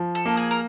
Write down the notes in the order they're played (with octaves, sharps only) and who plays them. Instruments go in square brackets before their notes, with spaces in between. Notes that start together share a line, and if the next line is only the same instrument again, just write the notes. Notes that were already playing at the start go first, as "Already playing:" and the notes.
Already playing: [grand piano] F3
[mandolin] A4
[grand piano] A#3
[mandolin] G#4
A#4